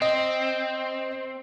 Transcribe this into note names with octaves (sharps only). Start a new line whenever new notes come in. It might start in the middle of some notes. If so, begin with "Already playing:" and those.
C4 D#5